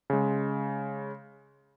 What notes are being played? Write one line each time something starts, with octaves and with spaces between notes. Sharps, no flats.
C#3 G#3